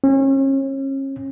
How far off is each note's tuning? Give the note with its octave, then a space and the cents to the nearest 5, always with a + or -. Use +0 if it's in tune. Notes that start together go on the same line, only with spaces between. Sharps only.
C#4 -35